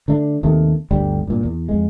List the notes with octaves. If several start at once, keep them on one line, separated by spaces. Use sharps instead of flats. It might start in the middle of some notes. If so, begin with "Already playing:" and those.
D3 A3 D4
D#2 C3 D#3 A3
G1 D2 G3
G2 A#2
E2
F2 G#3